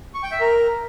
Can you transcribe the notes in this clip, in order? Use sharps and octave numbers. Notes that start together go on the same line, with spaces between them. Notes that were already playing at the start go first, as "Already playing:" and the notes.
C#6
G5
E5
A#4